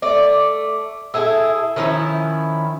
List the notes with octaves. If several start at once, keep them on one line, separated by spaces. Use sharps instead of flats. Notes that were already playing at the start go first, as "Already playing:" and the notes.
A3 D5
E4 G#4 A4 E5
D#3 F3 C#4 E4